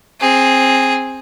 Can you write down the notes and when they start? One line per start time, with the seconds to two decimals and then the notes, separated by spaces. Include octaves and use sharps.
0.20 C4 G#4